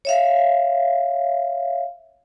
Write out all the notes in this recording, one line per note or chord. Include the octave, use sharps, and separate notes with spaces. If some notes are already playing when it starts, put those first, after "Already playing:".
C#5 E5 F5